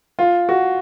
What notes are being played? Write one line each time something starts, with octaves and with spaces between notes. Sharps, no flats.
F4
F#4